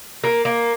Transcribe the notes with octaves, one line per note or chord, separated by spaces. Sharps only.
A#3
A#3